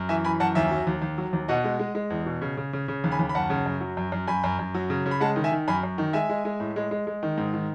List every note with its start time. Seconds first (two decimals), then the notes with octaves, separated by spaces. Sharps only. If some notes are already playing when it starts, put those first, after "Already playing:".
Already playing: F#2
0.09 E3 E5 G#5
0.24 E3 G#5 B5
0.40 F#2 F#5 A5
0.55 D#2 E5 G#5
0.71 F#3
0.87 D#2
1.02 D#2
1.18 F#3
1.33 D#2
1.48 B2 D#5 F#5
1.64 G#3
1.79 G#3
1.95 G#3
2.10 E2
2.26 B2
2.42 C#3
2.57 C#3
2.73 C#3
2.88 C#3
3.04 D#2
3.12 G#5 B5
3.19 D#2
3.29 B5
3.35 F#2 F#5 A5
3.50 C#3
3.66 F#2
3.81 F#3
3.97 F#2
4.12 F#2
4.27 F#2 G#5 B5
4.44 F#2
4.59 F#2
4.74 F#3
4.90 C#3
5.06 C#3
5.11 B5
5.20 G#3 F#5 A5
5.36 D#3
5.44 E5 G#5
5.52 D#3
5.68 F#2 G#5 B5
5.83 F#2
5.98 D#3
6.13 G#3 E5 G#5
6.30 G#3
6.45 G#3
6.60 A2
6.76 G#3
6.91 G#3
7.07 G#3
7.23 D#3
7.38 G#2
7.54 D#3